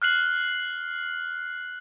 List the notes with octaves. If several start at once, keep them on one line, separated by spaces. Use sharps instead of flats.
F6 F#6 C7 F#7